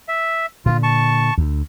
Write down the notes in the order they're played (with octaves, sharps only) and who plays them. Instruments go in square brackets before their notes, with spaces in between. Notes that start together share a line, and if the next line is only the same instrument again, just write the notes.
[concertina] E5
[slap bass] A#2 D3 [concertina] F4
[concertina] A5 C#6
[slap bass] D2